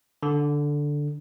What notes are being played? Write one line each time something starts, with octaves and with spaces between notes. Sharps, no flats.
D3